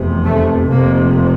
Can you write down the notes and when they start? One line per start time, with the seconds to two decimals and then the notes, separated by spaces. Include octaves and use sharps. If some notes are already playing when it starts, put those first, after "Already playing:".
Already playing: F1 E2 C3
0.24 A3
0.70 F1 F2 C3 A#3